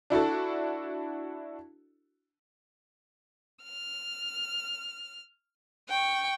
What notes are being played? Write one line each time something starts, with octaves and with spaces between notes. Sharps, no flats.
D4 E4 F#4 A4
F6
G5 C#6